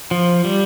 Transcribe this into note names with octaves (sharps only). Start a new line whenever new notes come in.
F3
G3